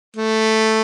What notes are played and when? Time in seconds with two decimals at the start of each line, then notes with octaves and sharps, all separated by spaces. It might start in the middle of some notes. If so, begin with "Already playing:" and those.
0.16 A3